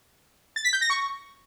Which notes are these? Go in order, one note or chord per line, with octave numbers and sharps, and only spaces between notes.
A6
B6
G6
A#6
C#6